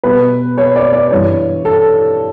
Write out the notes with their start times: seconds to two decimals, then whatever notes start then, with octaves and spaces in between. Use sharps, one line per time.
0.04 B2 G3 B4
0.58 C#5
0.76 D5
0.93 D5
1.11 G2 E3 G3 C#5
1.65 A4